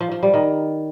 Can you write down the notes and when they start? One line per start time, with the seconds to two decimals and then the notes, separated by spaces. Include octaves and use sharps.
0.01 F3
0.12 F3
0.23 G3
0.34 D#3